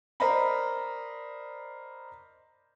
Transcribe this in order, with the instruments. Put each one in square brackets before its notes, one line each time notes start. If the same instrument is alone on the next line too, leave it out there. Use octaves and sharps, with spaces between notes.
[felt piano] A#4 C5 D5 D#5 A#5 B5